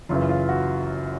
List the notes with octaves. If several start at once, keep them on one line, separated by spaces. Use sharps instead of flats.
F#1 F#2 C#3 E3 F4
F4
F#4